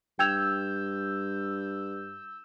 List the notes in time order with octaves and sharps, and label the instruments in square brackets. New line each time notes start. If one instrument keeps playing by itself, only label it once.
[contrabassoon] G2 [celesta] G5 G#6 F7 [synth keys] E6 G6